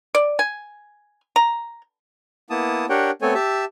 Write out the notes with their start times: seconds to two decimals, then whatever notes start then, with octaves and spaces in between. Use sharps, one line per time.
0.15 D5
0.39 G#5
1.36 A#5
2.50 A#3 B3 E4 A5 D#6
2.89 D4 G4 A#4 C#5 F#5 G5
3.22 A3 B3 C4 A4 C#5 G#5
3.34 G4 E5 A5 E6